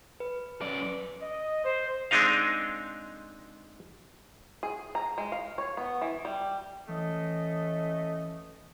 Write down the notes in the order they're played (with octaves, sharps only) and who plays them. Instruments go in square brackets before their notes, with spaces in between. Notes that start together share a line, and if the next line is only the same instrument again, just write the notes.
[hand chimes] B4
[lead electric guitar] F#2 D5
[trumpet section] D#5
C5
[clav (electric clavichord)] G#3 C4 D4 D#4 D#5 F5
[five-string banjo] G#4
A#5
G#3
F5
C#5
B3
E3
G3
[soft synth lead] E3 [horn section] A3 C#4 D#5